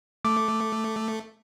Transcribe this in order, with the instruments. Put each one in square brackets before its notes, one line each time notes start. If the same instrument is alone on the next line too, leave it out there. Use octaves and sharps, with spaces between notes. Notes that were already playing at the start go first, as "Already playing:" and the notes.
[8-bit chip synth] A3 [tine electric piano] D6